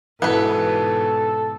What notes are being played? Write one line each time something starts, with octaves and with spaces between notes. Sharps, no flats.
G#2 B2 E3 B3 A4 B4